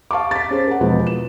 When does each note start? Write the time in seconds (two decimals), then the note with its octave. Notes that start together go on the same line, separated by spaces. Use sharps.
0.11 F5 A5 C#6 D6
0.31 A6 B6
0.51 C#4 G#4 C5
0.67 A#4 F#5
0.81 E2 B2 F3 G#3 B3
1.07 E7